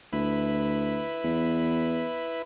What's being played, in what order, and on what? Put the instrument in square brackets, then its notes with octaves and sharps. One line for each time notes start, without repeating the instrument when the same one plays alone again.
[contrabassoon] D2 [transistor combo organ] E4 B4
[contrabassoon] E2